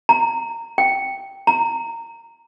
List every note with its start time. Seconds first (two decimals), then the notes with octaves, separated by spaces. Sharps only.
0.09 A#5
0.78 G5
1.47 A#5